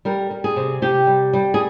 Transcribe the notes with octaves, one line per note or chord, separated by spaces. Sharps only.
G3 A#4
G3
G#4
C3
C3 G4
G3
G3
G#4